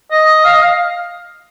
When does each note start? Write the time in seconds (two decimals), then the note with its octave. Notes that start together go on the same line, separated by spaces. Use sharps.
0.11 D#5
0.45 F5
0.53 D#5
0.61 F5